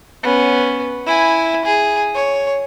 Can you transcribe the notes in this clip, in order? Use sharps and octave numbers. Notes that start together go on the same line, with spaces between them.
B3 C#4
E4 G#5
G#4
C#5